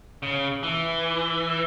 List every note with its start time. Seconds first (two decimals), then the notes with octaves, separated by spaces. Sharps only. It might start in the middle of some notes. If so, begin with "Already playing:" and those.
0.23 C#3
0.63 E3